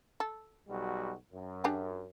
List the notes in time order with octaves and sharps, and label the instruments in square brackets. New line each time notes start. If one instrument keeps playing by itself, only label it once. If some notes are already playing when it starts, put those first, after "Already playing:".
[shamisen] A4
[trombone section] B1 G3 F#4
F#2
[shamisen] D4 G4 G#4